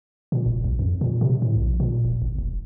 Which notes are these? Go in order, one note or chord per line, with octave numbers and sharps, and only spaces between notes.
A#2
F1
B1
F2
A#2
C3
A2
A#1
A#2
D1
G1
E1